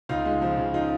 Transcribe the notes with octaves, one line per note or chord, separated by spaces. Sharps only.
C#2 D#4 F4
G#3
F3
C#3
D#4 F4